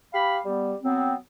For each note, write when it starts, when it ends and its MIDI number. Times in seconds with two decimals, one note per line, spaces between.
0.14 0.38 67
0.14 0.38 77
0.14 0.38 83
0.45 0.74 55
0.45 0.74 59
0.84 1.15 54
0.84 1.15 59
0.84 1.15 60